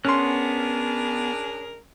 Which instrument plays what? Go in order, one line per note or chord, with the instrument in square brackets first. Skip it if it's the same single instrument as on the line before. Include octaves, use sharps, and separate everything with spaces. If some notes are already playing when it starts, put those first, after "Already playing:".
[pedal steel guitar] B3 F6 F#6 [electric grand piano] C#4 C6 [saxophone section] D4 G#4 A#4